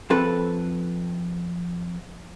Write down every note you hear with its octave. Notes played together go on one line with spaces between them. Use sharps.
F2 C4 A4 B4